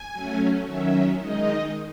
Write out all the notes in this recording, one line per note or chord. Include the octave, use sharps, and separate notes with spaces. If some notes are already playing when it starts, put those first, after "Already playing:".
Already playing: G#5
F#3 A3 C#4
D#3 F#3 C#4 E5
D#3 G#3 D#4 D#5